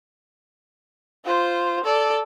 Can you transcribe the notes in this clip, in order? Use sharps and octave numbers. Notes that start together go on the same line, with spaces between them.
F4 C5
A4 D5